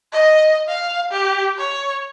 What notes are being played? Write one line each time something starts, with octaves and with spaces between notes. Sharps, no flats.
D#5
F5
G4
C#5